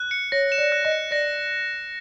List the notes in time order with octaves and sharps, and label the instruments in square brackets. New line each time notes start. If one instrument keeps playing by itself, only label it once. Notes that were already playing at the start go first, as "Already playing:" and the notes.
Already playing: [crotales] F#6
C#7
[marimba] C#5 [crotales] A#6
[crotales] E7
[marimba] D5
[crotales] F#6
[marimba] D#5
[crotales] C#7
[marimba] D5 [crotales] A#6